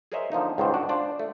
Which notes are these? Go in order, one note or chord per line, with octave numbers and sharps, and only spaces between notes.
G#4 A#4 C5 C#5 D#5 E5
D3 F3 A#3 D#4
C#2 G#2 D#3 C5
D4 F#4
D4 F4 C5 D5
A3